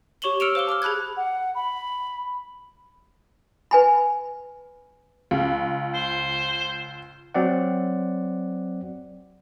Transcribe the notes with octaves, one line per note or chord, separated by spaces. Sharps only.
G4 C#5 C#6 E7 F#7 G7
E6 F6 C#7 D7 E7 F7
C5 F5 D6 G7
A5 D6 E6 F6
G#4 A5 B5 F#6 G#6
F#5
B5
B4 G#5 B5
C#2
C5
F#3 C4 D5 F#5